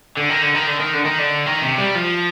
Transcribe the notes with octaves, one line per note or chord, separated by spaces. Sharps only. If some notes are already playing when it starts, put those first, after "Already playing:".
D3
D#3
D3
D#3
D3
D#3
D3
D#3
D3
D#3
C3
G3
F3